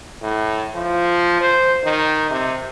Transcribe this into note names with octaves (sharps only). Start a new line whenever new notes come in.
A2
F3
C5
D#3
C3